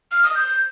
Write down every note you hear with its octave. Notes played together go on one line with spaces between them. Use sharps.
F6
D#6
G6